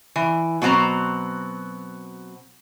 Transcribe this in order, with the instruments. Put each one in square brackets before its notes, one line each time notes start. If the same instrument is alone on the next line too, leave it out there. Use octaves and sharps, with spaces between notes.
[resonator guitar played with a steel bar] E3
B2 F#3 C4 A#5